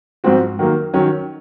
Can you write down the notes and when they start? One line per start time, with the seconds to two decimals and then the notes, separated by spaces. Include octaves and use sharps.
0.24 G#2 F3 C4 F#4
0.59 D#3 F#3 A#3
0.94 D#3 F#3 C#4